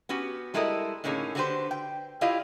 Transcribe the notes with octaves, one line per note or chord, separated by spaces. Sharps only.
B3 C#4 F#4 G4
G3 G#3 E4 A4 A#4 D#5
A2 D3 A#3 C#4 D#4 G#4
D3 F#4 G4 B4 C5
G5
E4 F4 G4 D5 D#5 F5